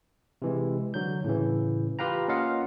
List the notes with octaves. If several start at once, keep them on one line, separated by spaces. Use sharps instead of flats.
C3 E3 G#3
D3 F#3 G6
A2 C#3 E3
F4 G4 B4 F5 G5 A#5
A#3 C#4 F4 D#5 F5 F#5